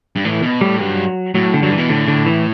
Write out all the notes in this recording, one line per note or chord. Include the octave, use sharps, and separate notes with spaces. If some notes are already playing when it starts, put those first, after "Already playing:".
G2
A2 E3
B2
A2 G3
G2 F#3
A2 F#3
D3
G2 F#3
E3
B2
A2 D3
D3
E3